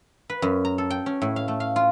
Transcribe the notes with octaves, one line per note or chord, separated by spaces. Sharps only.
B4
F#2
A#5
A4
G5
C#4
A2
F5
A3
F5
F4